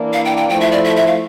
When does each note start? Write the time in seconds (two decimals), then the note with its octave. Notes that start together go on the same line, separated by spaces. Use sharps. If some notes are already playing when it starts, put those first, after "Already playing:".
Already playing: E3 A#3 D4
0.13 F5
0.25 G5
0.37 G5
0.49 F3 A3 E4 G5
0.61 E5
0.72 D5
0.85 E5
0.96 E5
1.07 F5